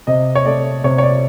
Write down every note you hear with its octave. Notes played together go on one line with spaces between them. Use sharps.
C3 D#5
C#5
A3 D5
C3 C#5
C#5
D5